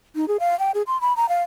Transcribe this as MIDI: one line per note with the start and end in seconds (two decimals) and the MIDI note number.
0.15 0.28 63
0.28 0.37 68
0.40 0.58 77
0.59 0.71 79
0.74 0.82 68
0.87 1.00 84
1.01 1.15 83
1.16 1.28 82
1.29 1.42 77